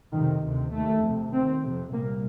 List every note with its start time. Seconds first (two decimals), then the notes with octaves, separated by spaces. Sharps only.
0.13 F2 C3 D#3
0.43 D2 C3
0.72 D#2 A3
1.02 F2 C3
1.32 D#2 C4
1.62 F2 C3
1.92 C2 A#2 A#3